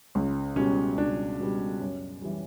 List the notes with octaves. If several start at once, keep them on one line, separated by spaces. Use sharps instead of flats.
C#2
B2 G3 C#4
C#2 D4
B2 G3
F#2
E3 G3